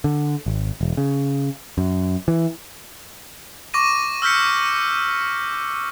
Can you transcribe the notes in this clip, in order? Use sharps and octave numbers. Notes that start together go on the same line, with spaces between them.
D3
G#1
E1
C#3
F#2
E3
C#6 D6 A#6 D#7
E6 F6 G6 B6 C#7